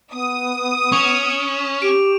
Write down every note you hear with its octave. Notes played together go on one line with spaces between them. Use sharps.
B3 D#6
C#4 C#6 F7
G4 D7